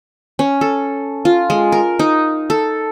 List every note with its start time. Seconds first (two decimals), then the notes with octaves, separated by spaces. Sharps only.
0.39 C#4
0.61 A4
1.25 F4
1.50 G#3
1.72 A#4
1.99 D#4
2.50 A4